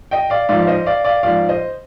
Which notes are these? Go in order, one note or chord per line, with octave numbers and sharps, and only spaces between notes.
D#5 G5
D5 F5
G#2 F3 D5 F5
F5
C5 D#5
D5 F5
D5 F5
G#2 F3 D5 F5
C5 D#5